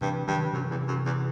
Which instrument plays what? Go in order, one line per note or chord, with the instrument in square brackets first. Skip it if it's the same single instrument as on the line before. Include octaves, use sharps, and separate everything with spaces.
[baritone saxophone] G2 [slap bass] C3 E3
[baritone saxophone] G2 [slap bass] D#3 F#3
[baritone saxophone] F#2 [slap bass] C3 E3
[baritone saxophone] E2
F#2
E2